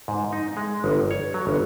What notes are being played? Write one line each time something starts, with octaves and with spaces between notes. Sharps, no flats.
G#2
D#4
G#3
G1
C#5
F#3
G1